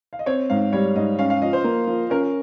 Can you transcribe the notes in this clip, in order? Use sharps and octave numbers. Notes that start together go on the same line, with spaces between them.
F5
D#5
C4 C#5
G#2 F5
G3 C#5
G#2 D#5
C#4 F5
F5
F3 D#5
C5
A#3
F3
C#4 A#4